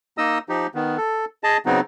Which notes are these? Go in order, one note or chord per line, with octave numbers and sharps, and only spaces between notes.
A#3 D#4 D#5 D#6 E6
F3 D#4 G4
D#3 B3
A4
G#4 D#5 A5
C#3 F#3 B3 C4 D#4